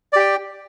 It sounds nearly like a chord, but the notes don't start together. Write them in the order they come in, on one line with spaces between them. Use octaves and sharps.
D5 G4 G5